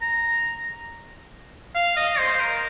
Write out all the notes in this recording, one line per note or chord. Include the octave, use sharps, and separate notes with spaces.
A#5
F5
D#5
C5
C5
A#4